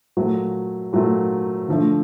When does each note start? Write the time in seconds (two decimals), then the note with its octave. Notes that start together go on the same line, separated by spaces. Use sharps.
0.17 A#2 F#3 A3
0.93 A#2 F#3 A3
1.68 D3 F3 A3